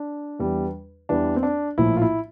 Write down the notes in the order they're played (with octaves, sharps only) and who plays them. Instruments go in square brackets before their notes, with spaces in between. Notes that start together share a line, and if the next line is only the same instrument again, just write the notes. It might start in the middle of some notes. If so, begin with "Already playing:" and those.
Already playing: [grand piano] D4
E2 E3 G3
E2 E3 G3 D4
C4
D4
A#1 A2 F3 E4
F4
E4